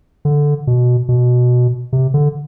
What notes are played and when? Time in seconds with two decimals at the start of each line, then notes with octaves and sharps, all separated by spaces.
0.25 D3
0.67 B2
1.09 B2
1.93 C3
2.14 D3